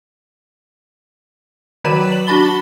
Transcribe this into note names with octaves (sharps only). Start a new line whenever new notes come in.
D#3 F#3 B4 D5 B5 E7
F#7
D4 F#4 A5 B5 A6 G7